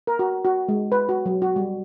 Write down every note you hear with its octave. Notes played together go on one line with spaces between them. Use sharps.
A#4
F#4
F#4
G#3
B4
F#4
F#3
F#4
G3